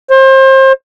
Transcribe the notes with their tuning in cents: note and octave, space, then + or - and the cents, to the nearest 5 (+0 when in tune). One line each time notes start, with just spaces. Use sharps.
C5 +30